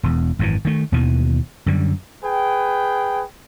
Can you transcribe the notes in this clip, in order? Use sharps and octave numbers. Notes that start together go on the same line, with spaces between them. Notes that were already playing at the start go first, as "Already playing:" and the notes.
E1 E2
G#1 F#2 D#3 E3
D#3 A3
D#2 B2 D#3 E3
F#2 D3 G3
G#4 B4 G5